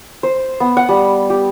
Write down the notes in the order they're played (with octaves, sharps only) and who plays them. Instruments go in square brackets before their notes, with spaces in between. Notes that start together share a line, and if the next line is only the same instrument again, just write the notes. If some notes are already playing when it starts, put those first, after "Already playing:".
[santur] C5
B3
F#5
G3
G4